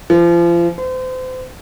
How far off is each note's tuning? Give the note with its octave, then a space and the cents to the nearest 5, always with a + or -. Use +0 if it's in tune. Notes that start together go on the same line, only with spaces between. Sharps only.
F3 -35
C5 -35